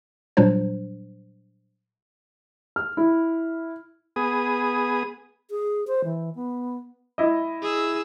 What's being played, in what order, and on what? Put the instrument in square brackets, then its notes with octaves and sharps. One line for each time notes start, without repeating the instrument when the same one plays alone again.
[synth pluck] A#2 F#3 G3 D4 C5
[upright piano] F6
E4
[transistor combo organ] B3 G#4 D#6
[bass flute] G#4
C5
E3
B3
[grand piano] E4 D#5
[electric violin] G#4 E6